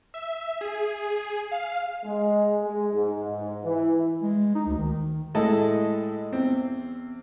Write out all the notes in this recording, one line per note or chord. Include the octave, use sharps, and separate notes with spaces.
E5
G#4
F5
G#3
G#3
G#2
G#2
E3
G#3
D#4
D2
D#3
A2 G#3 E4 A4 D#5 A5
E2 C4